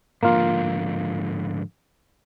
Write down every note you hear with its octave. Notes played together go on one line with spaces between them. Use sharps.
G#2 D3 F3 A#3 F4